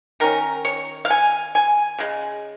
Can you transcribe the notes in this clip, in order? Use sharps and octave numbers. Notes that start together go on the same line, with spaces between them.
D#3 C#4 A#4
C#5
F5
G#5
G#5
C#3 G#3